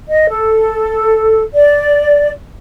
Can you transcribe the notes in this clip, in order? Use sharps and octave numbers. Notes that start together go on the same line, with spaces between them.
D#5
A4
D5